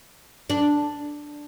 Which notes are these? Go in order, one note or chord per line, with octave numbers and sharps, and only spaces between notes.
D4